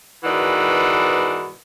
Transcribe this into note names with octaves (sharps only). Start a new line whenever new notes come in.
G#2 B2 D#3 E3 D5 F#5